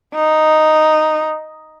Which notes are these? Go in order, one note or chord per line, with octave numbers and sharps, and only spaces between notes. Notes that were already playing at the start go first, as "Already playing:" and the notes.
D#4